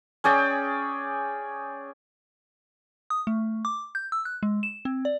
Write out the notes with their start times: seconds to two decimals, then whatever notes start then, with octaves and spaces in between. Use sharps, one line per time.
0.24 C#4 G#4 D5 G5
3.10 D#6
3.27 A3
3.65 D6
3.95 G6
4.12 E6
4.25 F#6
4.43 G#3
4.63 E7
4.85 C4
5.05 D5